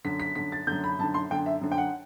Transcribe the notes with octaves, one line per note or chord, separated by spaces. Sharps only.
F#2 D3 B6
B6
F#2 D3 B6
A6
F#2 D3 G6
B5
F#2 D3 A5
C6
F#2 D3 G5
E5
F#2 D3
G5
F#5